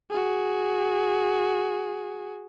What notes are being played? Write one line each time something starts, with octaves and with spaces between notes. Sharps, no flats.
F#4 G#4